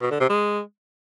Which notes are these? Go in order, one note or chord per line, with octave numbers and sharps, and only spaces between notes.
B2
D3
C3
G#3